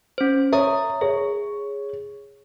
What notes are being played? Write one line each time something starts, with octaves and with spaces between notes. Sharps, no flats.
C#4 C5
C#5 E5 A#5 D#6
G#4 C#5